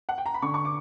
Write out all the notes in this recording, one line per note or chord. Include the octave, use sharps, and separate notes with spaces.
F#5
G5
A#5
B5
D3 C#6
C#6
D6